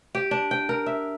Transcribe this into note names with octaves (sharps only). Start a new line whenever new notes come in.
G4
D4
G5
A#4
E5